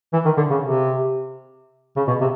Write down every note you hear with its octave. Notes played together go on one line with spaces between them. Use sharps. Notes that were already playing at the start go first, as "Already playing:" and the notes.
E3
D#3
D3
C#3
C3
C#3
B2
C3